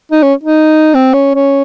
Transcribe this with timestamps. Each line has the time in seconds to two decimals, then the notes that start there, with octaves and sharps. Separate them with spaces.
0.12 D#4
0.23 C#4
0.43 D#4
0.94 C4
1.14 C#4
1.35 C#4